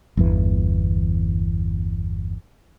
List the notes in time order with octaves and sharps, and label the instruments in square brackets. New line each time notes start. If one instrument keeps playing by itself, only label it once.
[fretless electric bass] G1 E2 E3